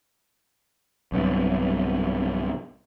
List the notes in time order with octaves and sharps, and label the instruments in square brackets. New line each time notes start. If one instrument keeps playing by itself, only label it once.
[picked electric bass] B1 G2 C3